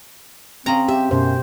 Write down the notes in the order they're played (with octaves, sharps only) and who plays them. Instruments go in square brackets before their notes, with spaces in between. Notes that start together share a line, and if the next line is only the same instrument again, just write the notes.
[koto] C#3 A#5 [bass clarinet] C4
[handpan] G4 [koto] E5
[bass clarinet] F#2 [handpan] B2 C5